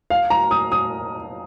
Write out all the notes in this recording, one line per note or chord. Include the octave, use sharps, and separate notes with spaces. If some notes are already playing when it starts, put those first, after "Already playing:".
F5
A#5
D#6
D#6